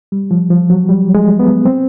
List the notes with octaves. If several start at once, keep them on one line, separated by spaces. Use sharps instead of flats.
G3
F3
F3
F#3
G3
G#3
B3
C4